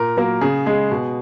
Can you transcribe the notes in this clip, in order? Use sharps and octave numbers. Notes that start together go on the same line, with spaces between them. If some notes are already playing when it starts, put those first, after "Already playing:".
Already playing: A#2 A#4
F#3 A#3 A#4
C#3 G#4
G#3 G#4
B2